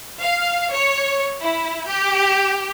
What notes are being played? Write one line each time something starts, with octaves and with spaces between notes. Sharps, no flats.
F5
C#5
E4
G4